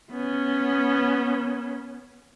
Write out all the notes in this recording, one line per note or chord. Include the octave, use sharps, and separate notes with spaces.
B3 C#4